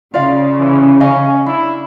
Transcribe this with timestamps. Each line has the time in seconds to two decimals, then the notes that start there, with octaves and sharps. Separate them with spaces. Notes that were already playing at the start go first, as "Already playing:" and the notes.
0.14 C#3 F4 D5 F5
0.59 E3
1.00 C#4 D#5 F5 G#5
1.46 D4 E4